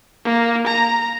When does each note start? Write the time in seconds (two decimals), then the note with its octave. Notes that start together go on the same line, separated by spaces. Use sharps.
0.25 A#3
0.67 A#5